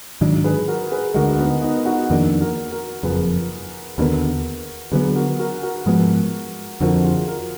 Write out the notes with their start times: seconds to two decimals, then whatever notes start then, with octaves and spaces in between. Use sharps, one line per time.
0.21 G#2 D#3 F#3 D4
0.44 G#4 B4
0.68 F#4 A#4
0.91 G#4 B4
1.14 D2 D3 G#3 F#4 A#4
1.39 B3 D#4
1.62 B3 D#4
1.85 D#4 F#4
2.10 F2 D#3 A#3 D4
2.41 F#4 A#4
2.72 F#4 A#4
3.03 F#1 F2 F3 G#4 B4
3.98 D#2 D3 F#3 B3 F#4 A#4
4.92 D2 D3 F#3 B3 G#4 B4
5.15 F#4 A#4
5.39 F#4 A#4
5.63 F#4 A#4
5.86 G#2 F3 G#3 B3
6.81 F2 D3 F3 F#4 A#4
7.04 F4 G#4
7.28 F#4 A#4